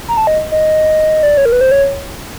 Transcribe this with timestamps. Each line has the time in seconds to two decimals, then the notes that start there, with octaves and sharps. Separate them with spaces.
0.08 A#5
0.17 A5
0.27 D#5
0.52 D#5
1.23 D5
1.37 C#5
1.45 A#4
1.52 B4
1.61 C5
1.71 C#5